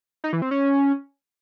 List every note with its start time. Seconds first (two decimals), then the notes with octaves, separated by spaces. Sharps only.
0.24 D#4
0.33 E3
0.42 C4
0.51 C#4